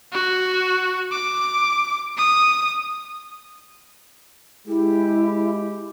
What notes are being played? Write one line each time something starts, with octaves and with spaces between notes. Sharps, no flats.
F#4
D6
D#6
G#3 E4 G4